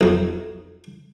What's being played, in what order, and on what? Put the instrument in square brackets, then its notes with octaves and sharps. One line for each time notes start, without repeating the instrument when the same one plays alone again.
[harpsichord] B1 F2